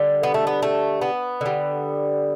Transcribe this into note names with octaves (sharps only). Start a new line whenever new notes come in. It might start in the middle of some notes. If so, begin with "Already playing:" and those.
Already playing: D3 G3
B3
A3
B3
A3
B3
D3 G3